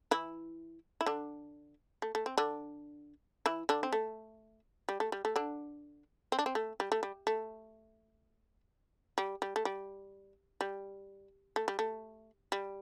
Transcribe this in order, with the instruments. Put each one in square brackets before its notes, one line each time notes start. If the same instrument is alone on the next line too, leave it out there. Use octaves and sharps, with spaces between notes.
[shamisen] E3 E4
E4
D3 D4
A3
A3
C4
D3 D4
E3 E4
D3 D4
C4
A3
G3
A3
G3
A3
D3 D4
C4
D4
C4
A3
G3
A3
G3
A3
G3
G3
A3
G3
G3
A3
G3
A3
G3